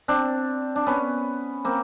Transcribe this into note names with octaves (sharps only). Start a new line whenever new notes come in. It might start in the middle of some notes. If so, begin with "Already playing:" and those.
C4 D4
D4
B3 C#4
A#3 C4